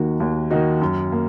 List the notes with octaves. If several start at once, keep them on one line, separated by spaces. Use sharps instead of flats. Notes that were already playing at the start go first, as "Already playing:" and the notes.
Already playing: D#2 D#3 A#3 D#4 F#4
D#2
D#3 A#3 D#4 F#4
F#2
A#3